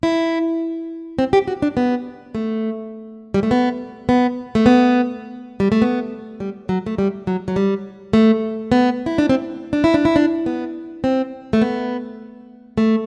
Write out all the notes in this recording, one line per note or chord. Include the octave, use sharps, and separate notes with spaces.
E4
C4
G4
F#4
D4
B3
A3
G3
A3
B3
B3
A3
B3
G3
A3
B3
G3
F#3
A3
G3
F#3
F#3
G3
A3
B3
E4
D4
C4
D4
E4
D4
E4
D4
B3
C4
A3
B3
A3